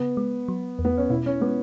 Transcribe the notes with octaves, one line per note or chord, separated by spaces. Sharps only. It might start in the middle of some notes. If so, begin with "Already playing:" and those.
Already playing: C#3 B3
G#3
F#3
E2
B3
C#4
B2 E4
C#4
G#3 B3